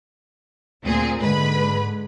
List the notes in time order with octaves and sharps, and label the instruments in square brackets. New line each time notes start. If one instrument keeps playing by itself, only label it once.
[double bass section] D2 [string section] A#2 C4 G#4
[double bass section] G#2 D3 G#3 [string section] B4 B5